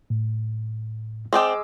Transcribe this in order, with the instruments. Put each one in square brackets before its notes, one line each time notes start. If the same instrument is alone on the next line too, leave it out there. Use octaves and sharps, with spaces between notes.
[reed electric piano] A2
[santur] G#3 D6 E6 [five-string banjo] C4 D5 G5